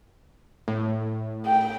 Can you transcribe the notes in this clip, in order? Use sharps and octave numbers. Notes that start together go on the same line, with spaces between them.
A2
G5